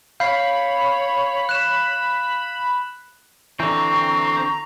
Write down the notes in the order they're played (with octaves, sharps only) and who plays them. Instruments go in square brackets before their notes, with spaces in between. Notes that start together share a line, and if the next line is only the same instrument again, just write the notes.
[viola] C#5 [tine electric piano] F5 [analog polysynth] B5 [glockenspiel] G6 C7
[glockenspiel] F#6 E7
[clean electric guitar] D3 E3 [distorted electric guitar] C4 [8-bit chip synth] A#5 [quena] C#6